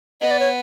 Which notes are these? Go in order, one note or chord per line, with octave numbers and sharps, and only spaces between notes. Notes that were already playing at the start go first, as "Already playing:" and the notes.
B3 D#5
D5
C#5